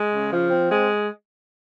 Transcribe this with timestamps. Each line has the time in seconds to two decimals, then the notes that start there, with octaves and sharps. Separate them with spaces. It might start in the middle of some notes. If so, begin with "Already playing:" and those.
Already playing: G#3
0.12 C#3
0.31 F3
0.50 C4
0.69 G#3